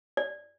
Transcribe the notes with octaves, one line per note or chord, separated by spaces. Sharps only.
D5